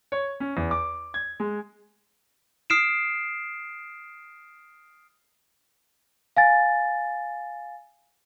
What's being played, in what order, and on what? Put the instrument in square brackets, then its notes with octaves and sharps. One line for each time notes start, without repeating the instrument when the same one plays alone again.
[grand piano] C#5
C#4
E2
D6
G#6
G#3
[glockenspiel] D#6 F6 C7 D7 E7
[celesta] F5 G#5 A6